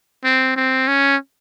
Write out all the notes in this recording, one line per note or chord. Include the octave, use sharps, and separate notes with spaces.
C4
C4
C#4